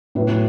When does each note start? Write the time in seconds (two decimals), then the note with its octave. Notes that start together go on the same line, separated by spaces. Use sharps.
0.15 A2 F#3 B4